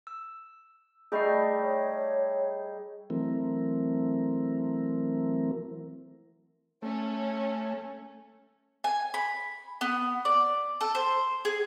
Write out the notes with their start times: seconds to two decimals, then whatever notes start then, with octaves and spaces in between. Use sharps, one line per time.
0.07 E6
1.12 G3 A3 D#4 G#4 D#5 C7
1.62 C#5
3.10 E3 F#3 A3 C4 E4 A#4
6.82 A3 C#4
8.84 G#5
9.14 B5
9.81 B3
10.25 D5
10.81 A4
10.95 C5
11.45 G#4